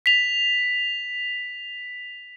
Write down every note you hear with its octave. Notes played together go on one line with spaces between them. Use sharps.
B6 F7